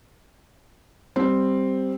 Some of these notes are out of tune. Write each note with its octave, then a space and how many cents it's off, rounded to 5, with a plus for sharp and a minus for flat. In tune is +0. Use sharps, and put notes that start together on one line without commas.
G3 +0 C4 +0